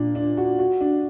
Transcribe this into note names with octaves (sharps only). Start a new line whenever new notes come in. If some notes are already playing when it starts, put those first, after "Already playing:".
Already playing: A#2 D4
D4
F#4
F#4
D4